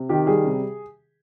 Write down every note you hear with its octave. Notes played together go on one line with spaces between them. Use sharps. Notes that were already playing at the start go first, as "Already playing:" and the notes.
Already playing: C3
D#3 G4
G3 G#4
C3